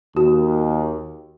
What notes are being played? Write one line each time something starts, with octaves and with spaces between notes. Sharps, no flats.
D#2 F#4